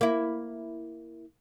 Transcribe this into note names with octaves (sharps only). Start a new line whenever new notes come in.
A#3 E4